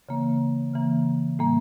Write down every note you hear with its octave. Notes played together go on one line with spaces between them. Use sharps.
C#3 E3 A#3
C#3 E3 A#3
A2 E3 G3 A#3